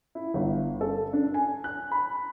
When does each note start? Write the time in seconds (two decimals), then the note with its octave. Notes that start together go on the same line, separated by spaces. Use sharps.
0.15 E4
0.34 G1
0.81 A4
1.13 D4
1.34 G#5
1.64 F#6
1.92 B5